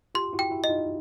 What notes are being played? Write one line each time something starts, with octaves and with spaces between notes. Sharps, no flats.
F4 G4 C6
E4 F#4
G5
E4 F#4
D#5
D#4 F4